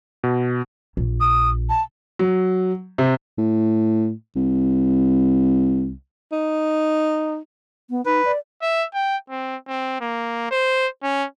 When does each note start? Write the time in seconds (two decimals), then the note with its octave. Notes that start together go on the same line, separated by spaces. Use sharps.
0.24 B2
0.97 A#1
1.20 D#6
1.69 A5
2.19 F#3
2.98 C3
3.38 A2
4.36 C2
6.32 D#4
7.90 B3
8.06 D#4 B4
8.25 D5
8.62 E5
8.94 G5
9.30 C4
9.68 C4
10.01 A#3
10.51 C5
11.03 C#4